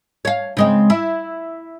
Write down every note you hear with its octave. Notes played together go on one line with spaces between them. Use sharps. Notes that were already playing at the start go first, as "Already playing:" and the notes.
C#5 F5
C#3 G#3 C4
E4